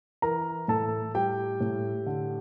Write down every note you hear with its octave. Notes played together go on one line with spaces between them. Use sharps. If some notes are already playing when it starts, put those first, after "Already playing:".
E3 A#4 A#5
A2 A4 A5
G3 G4 G5
A2
D3